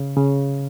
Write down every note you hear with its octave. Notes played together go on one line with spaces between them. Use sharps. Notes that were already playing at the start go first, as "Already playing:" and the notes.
Already playing: C#3
C#3